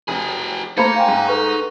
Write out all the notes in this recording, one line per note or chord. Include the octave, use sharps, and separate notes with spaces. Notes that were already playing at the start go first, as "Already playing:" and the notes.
F1 F#4 G#4
A3 A#3 D#4 C5 A#5 B5 G#6 C#7
F5 G5 G#5
G#2
A4 B4 C#6